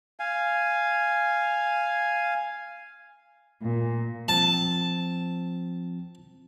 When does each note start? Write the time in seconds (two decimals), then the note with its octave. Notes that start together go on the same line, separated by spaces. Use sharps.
0.20 F5 G#5
3.62 A#2
4.28 F3 C4 A5